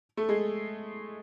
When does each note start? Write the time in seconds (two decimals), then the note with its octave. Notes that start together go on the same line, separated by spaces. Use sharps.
0.17 A3 A4
0.29 G#3 G#4